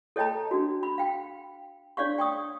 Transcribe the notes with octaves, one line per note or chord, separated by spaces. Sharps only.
A4 C#5 D#5 G5 A5 A#5
D4 F#4
B5
F5 G5
D4 C#5 D5 F5 C#6
G5 C#6 D#6